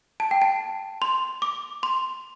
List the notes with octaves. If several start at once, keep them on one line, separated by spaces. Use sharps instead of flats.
A5
G5
A5
C6
D6
C6